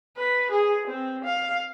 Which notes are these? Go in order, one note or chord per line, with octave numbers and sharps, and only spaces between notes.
B4
G#4
C4
F5